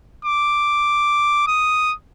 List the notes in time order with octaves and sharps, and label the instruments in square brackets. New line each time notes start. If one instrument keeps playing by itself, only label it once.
[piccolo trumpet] D6
D#6